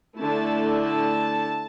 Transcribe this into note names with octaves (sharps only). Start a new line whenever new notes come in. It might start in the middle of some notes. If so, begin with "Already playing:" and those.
D3 A3 E4 A5
A5